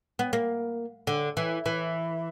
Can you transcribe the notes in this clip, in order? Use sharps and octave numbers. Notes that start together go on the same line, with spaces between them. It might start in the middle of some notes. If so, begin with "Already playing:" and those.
B3
A#3
D3
E3
E3